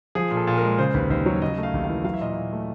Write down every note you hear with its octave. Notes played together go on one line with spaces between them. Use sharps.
F3 G#4
A#2
A4
A#2
A#4
G#3
C#3 C5
D#2 B4
D#2 C5
F#3 C#5
C#3 D#5
A3
F5
D#2
F5
E3
F#3 F5
E5
A#2 D#5
E5
A#2
A3